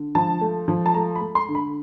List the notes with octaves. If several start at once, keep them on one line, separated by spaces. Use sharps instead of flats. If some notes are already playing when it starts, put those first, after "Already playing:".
Already playing: D3
F3 A5
A3
F3
A5
A3 A#5
B5
A3
C6
D3
B5